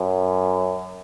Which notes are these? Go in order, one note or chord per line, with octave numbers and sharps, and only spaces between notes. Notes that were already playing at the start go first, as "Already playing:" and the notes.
Already playing: F#2